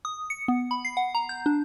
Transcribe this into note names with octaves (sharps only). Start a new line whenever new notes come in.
D#6
C#7
B3
B5
C7
F#5
A#5
G6
D4